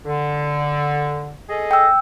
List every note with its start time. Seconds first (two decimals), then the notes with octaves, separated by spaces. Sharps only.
0.05 D3
1.48 G#4 A4 D#5
1.71 G5 E6